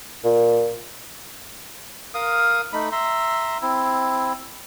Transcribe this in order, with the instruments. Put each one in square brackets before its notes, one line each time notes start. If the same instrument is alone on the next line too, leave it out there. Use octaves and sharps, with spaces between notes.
[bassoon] A#2
[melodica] A#4 F5 D#6
A3 D#4 B5
E5 A#5 C6
C4 E4